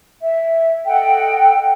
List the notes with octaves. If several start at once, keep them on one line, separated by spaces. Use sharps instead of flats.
E5
A4 D#5 F#5 G5